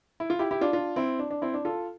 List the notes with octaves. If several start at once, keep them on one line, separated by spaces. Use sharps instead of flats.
E4
F4
E4 G4
E4 G4
D4 F4
D4 F4
C4 E4
D4
D4
C4 E4
D4
F4 A4